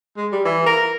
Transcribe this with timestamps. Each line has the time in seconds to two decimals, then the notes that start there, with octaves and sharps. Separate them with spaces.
0.17 G#3
0.32 G3
0.45 E3
0.66 A#4